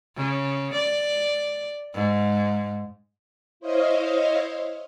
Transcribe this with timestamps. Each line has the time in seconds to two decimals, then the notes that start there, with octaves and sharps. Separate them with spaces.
0.16 C#3
0.74 D5
1.94 G#2
3.60 E4 C5 C#5 D#5 F5